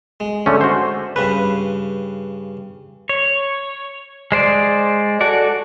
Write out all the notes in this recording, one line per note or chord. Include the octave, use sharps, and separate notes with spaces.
G#3
D3 A3 C#4
F#4 C5
G2 C#3 C#4 B4
C#5
G#3 C5 D5
F#4 A4 D5